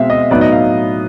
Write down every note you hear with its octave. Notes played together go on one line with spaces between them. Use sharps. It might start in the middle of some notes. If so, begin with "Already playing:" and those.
Already playing: B2 G#3 C4 E5 F5
D#5
A2 F#3 B3 D#4 D5
D#5
F5